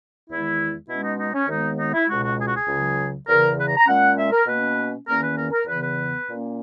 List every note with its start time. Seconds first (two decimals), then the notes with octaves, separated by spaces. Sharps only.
0.30 E2 D#3 G#3 E4
0.88 B2 G#3 C#4 E4
1.04 D#4
1.19 D#4
1.33 C#4
1.48 D#2 D#3 G#3 B3 D#4
1.78 D#4
1.94 E4
2.08 C#2 B2 G#3 F#4
2.24 F#4
2.38 G#4
2.47 F#4
2.56 G#4
2.68 C#2 C#3 F#3
3.27 E2 C#3 E3 A#4
3.58 B4
3.67 A#5
3.77 A#5
3.87 A#2 G#3 C#4 F#5
4.17 E5
4.32 A#4
4.47 B2 A#3 C#4 B4
5.07 E2 D#3 A#3 C#4 A#4
5.22 B4
5.37 A#4
5.51 A#4
5.66 E2 C#3 E3 B3 B4
5.81 B4
6.26 A#2 A#3 C#4